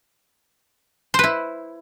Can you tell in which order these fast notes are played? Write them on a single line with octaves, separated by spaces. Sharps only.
C5 B4 E4